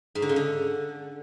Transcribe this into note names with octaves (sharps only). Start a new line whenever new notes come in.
G#2
D3
C#3
D3